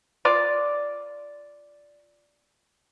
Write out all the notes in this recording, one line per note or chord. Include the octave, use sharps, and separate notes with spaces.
F4 D5